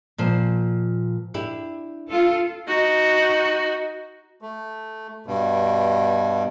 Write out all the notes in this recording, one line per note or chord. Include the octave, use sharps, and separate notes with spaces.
A#2 F3 C5
D4 E4 G4
F4 A4
D#4 F#4
A3
G2 B2